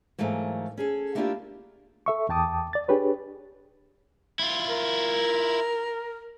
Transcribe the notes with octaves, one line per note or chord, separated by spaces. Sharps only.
G#2 E3 F#3 A3 A#3
C#4 G#4 A4
A3 A#3 D4 E4 F4 G4
A4 E5 C#6
E2 G5 A5 D6 D#6
D5 A6
D4 G4 G#4 B4 C#5
E4 F4
A#4